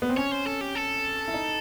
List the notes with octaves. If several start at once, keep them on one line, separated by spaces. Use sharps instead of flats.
B3
C4
C#4 C#5
C5
A4
G4
A4
E4
D#4